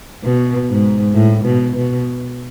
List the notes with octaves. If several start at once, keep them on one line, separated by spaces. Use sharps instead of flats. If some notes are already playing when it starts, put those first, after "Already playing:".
B2
G#2
A2
B2
B2